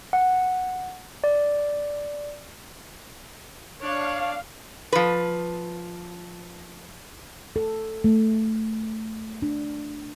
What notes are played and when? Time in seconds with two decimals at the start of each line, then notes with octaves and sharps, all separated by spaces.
0.13 F#5
1.24 D5
3.82 D4 C#5 F5
4.93 F3 B4
7.56 A4
8.04 A3
9.42 D4